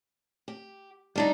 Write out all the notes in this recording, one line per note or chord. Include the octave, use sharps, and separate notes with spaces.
G4
G3 D4 D#4